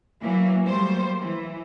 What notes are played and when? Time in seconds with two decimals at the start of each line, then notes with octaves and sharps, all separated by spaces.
0.21 E3 F#3 A#3
0.62 F#3 G3 A3 A#3 C5
1.20 E3